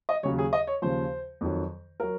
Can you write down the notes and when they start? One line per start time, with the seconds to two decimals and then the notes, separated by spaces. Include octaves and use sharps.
0.09 D#5
0.23 D#2 C#3 F#3 C#5
0.39 G#4
0.53 D#5
0.67 C#5
0.82 D#2 C#3 F3 C5
1.41 F2 D#3 F#3
2.00 F#3 A#4